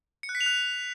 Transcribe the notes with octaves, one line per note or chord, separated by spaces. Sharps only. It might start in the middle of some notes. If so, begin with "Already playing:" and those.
C#7
F#6
B6
F7
F#6